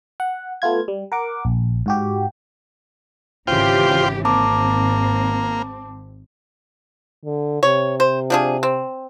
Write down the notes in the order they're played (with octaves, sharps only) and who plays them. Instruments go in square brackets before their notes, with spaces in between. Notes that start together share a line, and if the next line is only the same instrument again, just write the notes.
[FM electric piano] F#5
A3 B3 F4 G#6
G3
A#4 F#5 D6
A#1
G#2 F#4 G4
[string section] G#1 [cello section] C#3 E3 G4 [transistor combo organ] F4 C5 G5
[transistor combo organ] A#3 [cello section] C4 [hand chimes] A5 D6
[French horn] D3
[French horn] C3 [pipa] C#5
[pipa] C5
F3 D4 G#4
C4